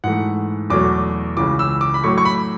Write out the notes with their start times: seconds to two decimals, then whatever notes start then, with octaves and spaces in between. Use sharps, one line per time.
0.04 G#2 E3 A3 F#5
0.70 E2 B2 F#3 A3 D6
1.37 C#2 C#3 E3 D6
1.59 E6
1.81 D6
1.94 B5
2.03 A2 F#3 A3 C#6
2.18 C#6
2.25 B5